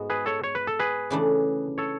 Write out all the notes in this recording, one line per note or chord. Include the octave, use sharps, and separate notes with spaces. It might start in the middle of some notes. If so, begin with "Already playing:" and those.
Already playing: G#2 G#3 B3 F#4
G#4 B4
A4 C#5
C#5
B4
A4
G#4 B4
C#3 E3 A3 D4
A4 C#5